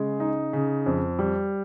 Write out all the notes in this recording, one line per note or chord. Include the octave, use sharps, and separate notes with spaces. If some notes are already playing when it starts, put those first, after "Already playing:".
Already playing: C#3 G#3
D#4
C#3
F2
G3